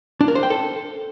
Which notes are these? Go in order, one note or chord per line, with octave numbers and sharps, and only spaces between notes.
D4
A#4
C5
G5
A4